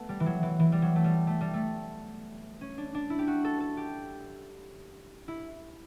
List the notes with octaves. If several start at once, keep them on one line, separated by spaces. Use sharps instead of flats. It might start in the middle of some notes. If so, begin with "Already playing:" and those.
Already playing: A3 B3
G3
E3
F#3
E3
E3
G3
F#3
A3
G3
A3
G3
A3
C#4
D4
D4
E4
G4
F#4
A4
A4
G4
E4